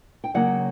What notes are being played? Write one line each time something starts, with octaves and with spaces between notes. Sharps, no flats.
G5
C#3 F#3 A#3 F#5